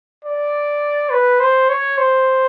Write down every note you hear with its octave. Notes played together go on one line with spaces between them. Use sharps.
D5
B4
C5
C#5
C5